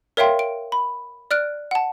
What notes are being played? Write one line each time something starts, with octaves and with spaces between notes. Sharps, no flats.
A#4 C#5 E5 F5 G5 C6
D7
B5
D5 F6 F#6 D7
F#5 A5